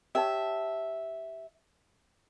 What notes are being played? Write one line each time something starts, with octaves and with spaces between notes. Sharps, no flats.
G4 C#5 E5 A5